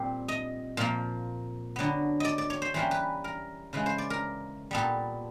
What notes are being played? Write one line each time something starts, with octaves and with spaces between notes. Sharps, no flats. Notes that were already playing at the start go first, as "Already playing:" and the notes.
Already playing: A#2 G3 C4 D5
D#5
A#2 F3 A#3
D3 F#3 B3
D5 D#5
D5
C#5
C5
E3 G3 A#3 C#4 C5
B4
A#4
C#3 E3 G#3 B4
C5
D5
A#4
A#2 G3 B3 A4